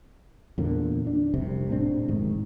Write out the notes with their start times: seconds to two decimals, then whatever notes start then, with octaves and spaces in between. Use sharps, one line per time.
0.58 E2 A#2 D3 A#3
1.07 D4
1.34 F1 C2 C3
1.69 D#1 A2 C4 D4
2.08 F1 G#2 D#3